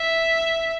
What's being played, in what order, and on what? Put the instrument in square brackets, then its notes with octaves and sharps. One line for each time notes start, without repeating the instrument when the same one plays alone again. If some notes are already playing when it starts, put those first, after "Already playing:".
Already playing: [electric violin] E5